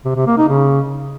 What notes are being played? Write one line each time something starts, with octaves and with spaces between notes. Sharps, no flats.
C3
C3
A#3
D#4
C#3